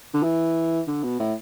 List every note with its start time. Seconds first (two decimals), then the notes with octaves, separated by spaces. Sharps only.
0.14 D3
0.23 E3
0.87 D3
1.03 B2
1.19 A2